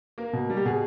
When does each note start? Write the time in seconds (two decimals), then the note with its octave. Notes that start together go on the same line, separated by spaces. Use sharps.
0.18 A#3 A#4
0.33 B2
0.50 G3
0.57 G4
0.65 B2 G#4